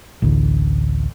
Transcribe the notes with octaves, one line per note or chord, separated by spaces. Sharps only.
A1 D2